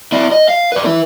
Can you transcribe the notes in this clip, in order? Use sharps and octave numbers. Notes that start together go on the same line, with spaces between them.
E4 D5
D#5
F5
B4 D5
E4 B4